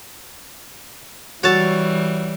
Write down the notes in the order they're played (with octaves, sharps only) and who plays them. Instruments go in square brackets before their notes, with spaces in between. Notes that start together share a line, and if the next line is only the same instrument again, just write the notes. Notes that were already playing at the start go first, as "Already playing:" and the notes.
[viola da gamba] E3 G3 [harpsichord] F#4 A4 [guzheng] C#5 A5